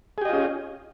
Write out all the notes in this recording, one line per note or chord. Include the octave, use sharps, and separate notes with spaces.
C#4 F4 G4 G#4 D#5